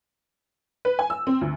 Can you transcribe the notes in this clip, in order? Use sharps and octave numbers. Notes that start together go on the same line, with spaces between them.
B4
G#5
E6
C4
D2